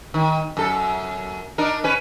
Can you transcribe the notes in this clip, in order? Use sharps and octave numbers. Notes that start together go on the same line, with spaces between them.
D#3
F#2 A4
D4 D#4 A#4
C#4 B4